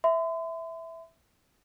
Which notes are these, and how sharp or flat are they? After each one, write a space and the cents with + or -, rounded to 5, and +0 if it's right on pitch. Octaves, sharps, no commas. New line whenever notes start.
E5 -5 C6 -45